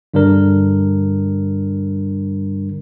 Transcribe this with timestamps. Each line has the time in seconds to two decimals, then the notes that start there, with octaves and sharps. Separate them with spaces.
0.14 G2 D3 G3 D4 A#4